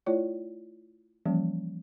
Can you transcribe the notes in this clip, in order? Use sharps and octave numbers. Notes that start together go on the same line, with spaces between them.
A3 E4 F4 C#5 D5
E3 F3 G3 A#3 C#4